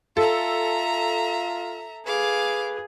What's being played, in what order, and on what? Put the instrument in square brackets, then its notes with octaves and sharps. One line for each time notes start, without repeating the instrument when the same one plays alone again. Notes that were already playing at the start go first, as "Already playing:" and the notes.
[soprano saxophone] F4 [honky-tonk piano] A4 [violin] E5 A#5
[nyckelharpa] G#4 [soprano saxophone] B4 [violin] F5 D6